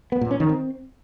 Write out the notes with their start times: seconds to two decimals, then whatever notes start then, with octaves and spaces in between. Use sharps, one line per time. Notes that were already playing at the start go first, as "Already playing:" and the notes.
0.12 B3
0.21 A#2
0.31 C#4
0.40 D#3
0.49 C4